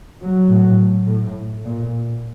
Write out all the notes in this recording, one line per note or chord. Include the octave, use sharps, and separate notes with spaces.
F#3
A2
A2
A#2